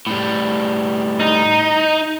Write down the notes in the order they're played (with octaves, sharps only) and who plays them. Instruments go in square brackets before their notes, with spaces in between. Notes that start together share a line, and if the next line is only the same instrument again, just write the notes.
[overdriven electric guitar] A2 G3
[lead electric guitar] D#4